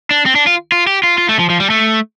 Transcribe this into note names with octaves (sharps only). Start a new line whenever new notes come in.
D4
C4
D4
F4
F4
G4
F4
F4
A3
F3
F3
G3
A3